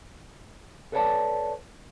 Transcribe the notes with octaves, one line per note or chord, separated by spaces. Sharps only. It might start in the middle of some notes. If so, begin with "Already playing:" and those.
A4 B4 C#5 D5 F#5 A5